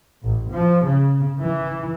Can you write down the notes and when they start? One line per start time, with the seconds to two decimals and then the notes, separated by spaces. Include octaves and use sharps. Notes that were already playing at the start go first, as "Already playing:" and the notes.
0.22 A1
0.51 F3
0.85 C#3
1.40 E3